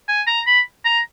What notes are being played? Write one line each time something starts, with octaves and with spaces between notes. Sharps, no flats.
G#5
A#5
B5
A#5